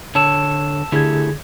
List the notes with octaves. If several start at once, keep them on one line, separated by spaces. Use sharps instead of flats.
D3 C#5 A5 E6 E7
D3 A3 E4 G4 G#4 G#6